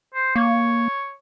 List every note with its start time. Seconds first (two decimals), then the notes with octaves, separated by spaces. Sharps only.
0.14 C5
0.36 A#3 C#5